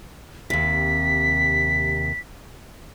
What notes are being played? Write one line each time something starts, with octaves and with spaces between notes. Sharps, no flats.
D#2 C3 B6